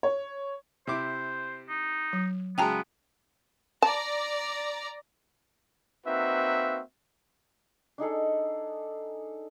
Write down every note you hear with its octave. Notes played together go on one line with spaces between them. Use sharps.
C#5
C3 E4 C5 D6
D#4
F#3
C#3 F#3 G#3 B3 G5 A5 A#5
D5 A5 A#5
A#3 C4 D#4 F#4 B4 E5
D4 D#4 G#4 A4